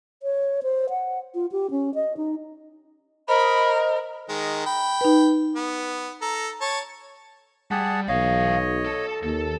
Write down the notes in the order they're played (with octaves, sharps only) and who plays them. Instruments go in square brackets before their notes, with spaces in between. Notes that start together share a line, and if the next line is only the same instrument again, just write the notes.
[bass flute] C#5
C5
F#5
F4
G4
C#4
D#5
D#4
[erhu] A#4 [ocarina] C5 [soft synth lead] D#5 [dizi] B5
[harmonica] D#3 G#3
G5 B5
[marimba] D#4 B4
[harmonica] B3
A4 A#5
C#5 A5
[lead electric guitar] G3 [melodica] G#4 F#5 A5
[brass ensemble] B1 [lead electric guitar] E3 F5 [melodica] C#5 D#5
[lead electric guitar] A4
[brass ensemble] D#2 [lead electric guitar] A4